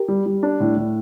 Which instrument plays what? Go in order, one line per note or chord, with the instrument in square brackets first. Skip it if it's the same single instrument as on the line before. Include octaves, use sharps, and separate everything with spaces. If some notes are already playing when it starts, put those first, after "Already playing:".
Already playing: [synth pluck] G4 A#4
[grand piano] G3
G3
D4
A2
A2